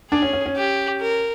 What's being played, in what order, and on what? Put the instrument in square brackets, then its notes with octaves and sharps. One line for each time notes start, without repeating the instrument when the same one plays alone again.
[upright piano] D4 [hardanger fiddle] G#4
[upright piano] C#4
C#4
C#4
[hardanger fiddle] G4
A#4